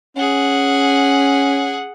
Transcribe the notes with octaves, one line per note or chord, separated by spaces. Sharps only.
C#4 G#4 F#5